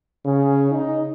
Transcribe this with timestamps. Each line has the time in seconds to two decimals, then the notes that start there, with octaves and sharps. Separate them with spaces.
0.25 C#3
0.72 D#4